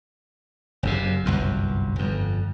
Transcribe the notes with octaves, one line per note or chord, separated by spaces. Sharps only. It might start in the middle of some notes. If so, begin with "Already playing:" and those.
F#1 F#2 C3
G1 C2 F#2
G1 F2